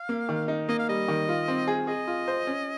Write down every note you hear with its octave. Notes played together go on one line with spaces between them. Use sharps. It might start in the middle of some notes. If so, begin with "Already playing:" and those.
Already playing: F5
A#3
D#3
D#4
A#3 D#5
F5
G3 D#5
D#3
F4
C4
G#4
G#4 D#5
F4
C5
C#4